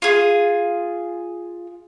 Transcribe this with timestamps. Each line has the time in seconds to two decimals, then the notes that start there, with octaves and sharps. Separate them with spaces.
0.02 F4 G#4